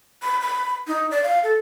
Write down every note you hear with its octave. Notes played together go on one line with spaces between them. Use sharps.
B5
B5
D#4
D5
F5
A4